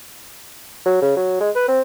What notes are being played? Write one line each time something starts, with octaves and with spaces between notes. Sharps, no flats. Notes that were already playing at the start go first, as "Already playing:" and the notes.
F#3
C#3
F#3
G#3
B4
C4